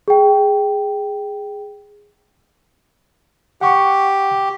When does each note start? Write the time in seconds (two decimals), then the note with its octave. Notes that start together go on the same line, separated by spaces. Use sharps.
0.08 G#4 G5
3.61 G4 F#5 C#6